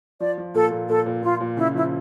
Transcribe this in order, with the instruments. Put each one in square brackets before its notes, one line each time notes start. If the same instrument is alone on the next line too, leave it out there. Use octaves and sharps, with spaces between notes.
[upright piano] F3 [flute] D5
[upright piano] F3
[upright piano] A#2 [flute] A4
[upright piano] A#2
[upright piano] A#2 [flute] A4
[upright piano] A#2
[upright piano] A#2 [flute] F4
[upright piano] A#2
[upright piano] C#3 [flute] E4
[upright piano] F3 [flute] E4